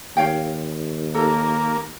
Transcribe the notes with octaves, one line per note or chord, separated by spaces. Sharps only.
D#2 C#5 F5 G5
A#3 A4 A#5